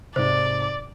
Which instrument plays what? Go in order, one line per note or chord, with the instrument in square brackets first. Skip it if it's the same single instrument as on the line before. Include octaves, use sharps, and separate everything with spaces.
[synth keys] G#2 C3 [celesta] C5 [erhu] D5